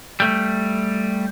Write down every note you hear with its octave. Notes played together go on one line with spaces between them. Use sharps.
G3 A3